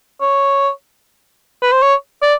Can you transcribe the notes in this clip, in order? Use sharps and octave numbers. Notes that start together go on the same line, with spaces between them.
C#5
B4
C5
C#5
D5